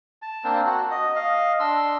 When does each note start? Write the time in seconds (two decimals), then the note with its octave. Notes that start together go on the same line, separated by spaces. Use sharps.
0.22 A5
0.44 A#3 C4 D4
0.66 F#4
0.91 D#5
1.16 D#5 F5
1.60 D4 C6 E6